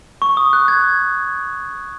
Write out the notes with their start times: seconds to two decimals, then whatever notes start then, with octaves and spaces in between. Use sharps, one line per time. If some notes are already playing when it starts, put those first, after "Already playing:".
0.22 C#6
0.37 D#6
0.53 F#6
0.68 G#6